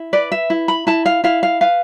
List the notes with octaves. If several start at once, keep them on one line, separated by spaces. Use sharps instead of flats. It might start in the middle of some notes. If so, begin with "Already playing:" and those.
Already playing: E4
B4 D5
E5
E4
B5
E4 A5
F5
E4 F5
F5
B4 F5